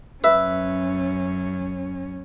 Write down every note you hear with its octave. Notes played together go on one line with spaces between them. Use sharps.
F#2 C#4 B4 E5